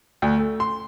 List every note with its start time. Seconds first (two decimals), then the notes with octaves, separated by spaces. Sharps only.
0.22 D2
0.38 A3
0.60 C6